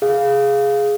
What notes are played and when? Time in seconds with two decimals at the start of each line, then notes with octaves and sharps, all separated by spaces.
0.02 G#4 F5